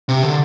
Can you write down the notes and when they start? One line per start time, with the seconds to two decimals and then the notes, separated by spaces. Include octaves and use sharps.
0.09 C3
0.23 D3